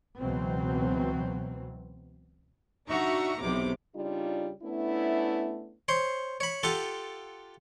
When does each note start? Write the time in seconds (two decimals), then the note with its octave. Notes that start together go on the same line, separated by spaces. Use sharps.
0.21 C#2 B2 E3 F#3 C4
2.88 D4 D#4 F#4 E5 A#5 C#6
3.40 B1 E2 C3 B3 D6
3.95 C#3 G3 D4 D#4 F4
4.63 A3 B3 C#4 D4 E4
5.88 C5 C#5 C6
6.40 C#5 B5
6.63 F4 G4 A4 F#5